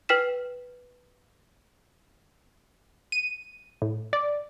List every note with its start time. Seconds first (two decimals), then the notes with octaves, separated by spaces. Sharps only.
0.09 B4 G5 F6 B6 E7
3.12 D#7
3.82 A2
4.13 D5